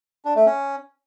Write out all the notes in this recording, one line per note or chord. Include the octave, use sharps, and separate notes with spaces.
D4
A3
C#4